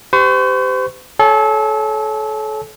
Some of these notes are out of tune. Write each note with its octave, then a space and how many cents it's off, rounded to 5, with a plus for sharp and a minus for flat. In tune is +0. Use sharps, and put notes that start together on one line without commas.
G4 +0 C5 -40 C#6 +0
A4 -30 C#5 +5 G#5 +0